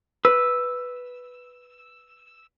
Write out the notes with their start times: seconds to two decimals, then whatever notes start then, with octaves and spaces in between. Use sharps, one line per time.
0.25 B4 E6